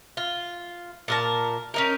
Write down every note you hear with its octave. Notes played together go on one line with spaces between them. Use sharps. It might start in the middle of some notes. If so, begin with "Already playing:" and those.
F4
A#2 A#4 A5
C#4 D#4 A#4